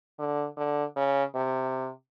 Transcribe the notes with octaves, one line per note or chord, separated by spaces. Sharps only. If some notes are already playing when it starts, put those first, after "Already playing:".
D3
D3
C#3
C3